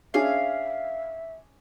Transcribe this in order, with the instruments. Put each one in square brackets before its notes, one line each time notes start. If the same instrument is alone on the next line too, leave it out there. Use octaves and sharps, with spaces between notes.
[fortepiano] C#4 D4 G#4 [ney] E5 [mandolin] F5